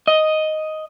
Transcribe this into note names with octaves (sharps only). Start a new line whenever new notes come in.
D#5